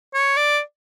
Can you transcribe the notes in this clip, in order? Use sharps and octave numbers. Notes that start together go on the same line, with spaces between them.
C#5
D5